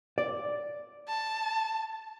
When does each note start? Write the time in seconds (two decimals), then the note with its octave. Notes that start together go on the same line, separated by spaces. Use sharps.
0.18 D5
1.08 A5